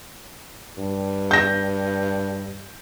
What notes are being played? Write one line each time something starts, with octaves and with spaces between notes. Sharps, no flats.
G2
G6 A#6